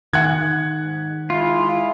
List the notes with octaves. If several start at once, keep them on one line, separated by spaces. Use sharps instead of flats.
D#3 F#5 F#6 G#6
G#2
G#3 E4 F4